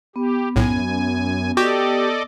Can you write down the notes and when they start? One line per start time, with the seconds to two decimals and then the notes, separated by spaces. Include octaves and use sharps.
0.16 B3 G4
0.56 B1 F#2 A2 G#5
1.57 F#4 G4 A4 D5 D#5